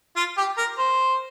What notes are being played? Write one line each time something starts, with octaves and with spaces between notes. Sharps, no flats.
F4
G4
A#4
C5